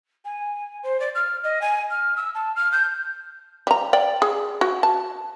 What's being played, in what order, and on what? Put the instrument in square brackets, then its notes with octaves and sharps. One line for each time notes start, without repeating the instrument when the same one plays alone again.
[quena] G#5
C5
D5
F6
D#5
G#5
F6
E6
A5
F6
G6
[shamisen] G3 A#5
D5 G5
G#4
F#4
A5